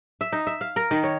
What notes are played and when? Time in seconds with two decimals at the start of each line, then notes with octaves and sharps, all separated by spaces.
0.21 E5
0.32 D#4
0.47 E5
0.61 F5
0.76 A#4
0.91 D#3
1.04 C#5